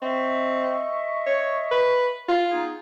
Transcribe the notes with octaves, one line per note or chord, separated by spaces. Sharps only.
C4 D#5 E5 C#6
C#5
B4
F4
B3 D#4 G#4